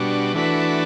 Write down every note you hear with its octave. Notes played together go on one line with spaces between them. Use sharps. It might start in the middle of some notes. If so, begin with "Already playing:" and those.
Already playing: B2 G3 D4 F#4
E3 A3 D4 F#4 B4